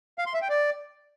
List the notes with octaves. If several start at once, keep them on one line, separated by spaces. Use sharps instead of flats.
F5
C6
E5
G5
D5